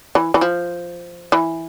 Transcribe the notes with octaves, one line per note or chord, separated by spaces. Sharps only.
E3
E3
F3
E3